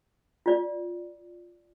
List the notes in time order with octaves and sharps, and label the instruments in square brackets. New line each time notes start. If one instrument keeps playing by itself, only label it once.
[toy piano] F4 D5